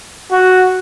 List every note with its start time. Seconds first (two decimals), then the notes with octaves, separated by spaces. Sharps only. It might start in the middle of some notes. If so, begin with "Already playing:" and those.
0.32 F#4